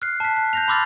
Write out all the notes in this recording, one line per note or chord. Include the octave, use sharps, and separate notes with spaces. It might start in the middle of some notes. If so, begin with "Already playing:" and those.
F6 F#6 C7
A5 B6
F#6
G6 A#6 F7
B5 C6 D6 E6 F6 A6